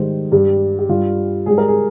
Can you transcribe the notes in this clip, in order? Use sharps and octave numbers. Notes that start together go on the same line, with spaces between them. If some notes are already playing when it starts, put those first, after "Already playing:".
Already playing: G#2 D#3 G3 C5
G2 G3 G4
G4
G2 G3 F4
G#2 G3 G#4
A#4
G#4